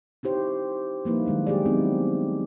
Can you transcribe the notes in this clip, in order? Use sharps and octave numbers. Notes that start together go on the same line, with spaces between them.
D#4 E4 G4 C5 C#5
F3 G3 A#3 D#4 E4 B4
D#3 F#3 G#3 D4
G3 G4 G#4 D5
F#3 B3 C4 D#4 E4